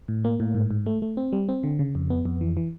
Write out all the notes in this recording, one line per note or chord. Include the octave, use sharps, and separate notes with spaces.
A2
A#3
A2
G#2
G#2
A3
A3
C4
G3
C4
D3
C#3
F2
B3
F2
E3
E3